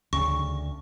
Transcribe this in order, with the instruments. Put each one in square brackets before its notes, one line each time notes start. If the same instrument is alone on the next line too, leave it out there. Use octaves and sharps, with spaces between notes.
[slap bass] D2 [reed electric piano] C#3 [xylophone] C#6